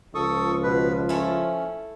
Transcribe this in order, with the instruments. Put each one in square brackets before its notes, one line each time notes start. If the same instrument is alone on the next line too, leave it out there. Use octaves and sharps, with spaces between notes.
[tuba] C#2 [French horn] F3 [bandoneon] A4 C#6 D#6
[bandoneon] B2 B4
[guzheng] A3 E4 [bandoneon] C#4